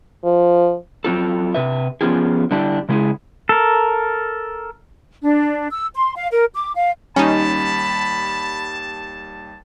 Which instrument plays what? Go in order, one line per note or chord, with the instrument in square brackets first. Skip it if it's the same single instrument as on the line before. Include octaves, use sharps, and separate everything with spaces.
[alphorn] F3
[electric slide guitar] F#3 C4 F4 A4
C3 B4 E5
F3 B3 C#4 F4 G4 G#4
D3 G3 D4 E4 G4
C#3 G#3 E4 G4 G#4
[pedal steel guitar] A4 A#4
[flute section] D4
E6
C6
F5
A#4
D6
F5
[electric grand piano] D#2 G3 [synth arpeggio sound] C#4 D#4 [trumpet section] A5 [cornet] B5